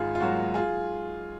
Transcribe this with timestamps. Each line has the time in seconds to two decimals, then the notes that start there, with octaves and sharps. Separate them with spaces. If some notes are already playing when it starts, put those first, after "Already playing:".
Already playing: G#1 F4 G#4
0.15 F4
0.20 G#2 F#3 A#3 F#4
0.54 F4 G#4